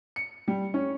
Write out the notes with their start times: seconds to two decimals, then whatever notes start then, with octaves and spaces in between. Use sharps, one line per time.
0.16 C#7
0.48 G3
0.74 C#4